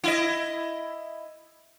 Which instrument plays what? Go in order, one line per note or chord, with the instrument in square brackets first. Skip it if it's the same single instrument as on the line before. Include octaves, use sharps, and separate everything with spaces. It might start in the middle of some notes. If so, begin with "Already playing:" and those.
[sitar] E4 D#5